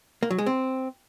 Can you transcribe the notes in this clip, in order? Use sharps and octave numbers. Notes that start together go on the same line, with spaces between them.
A#3
F#3
G#3
C4